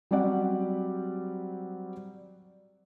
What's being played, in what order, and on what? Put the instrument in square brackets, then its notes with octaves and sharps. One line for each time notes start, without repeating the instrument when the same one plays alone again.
[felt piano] F#3 G3 C4 G4 D5 F#5